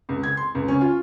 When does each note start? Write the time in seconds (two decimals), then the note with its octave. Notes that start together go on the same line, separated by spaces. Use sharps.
0.09 C#2
0.23 G#6
0.37 C6
0.55 C#2
0.68 C#4
0.81 F4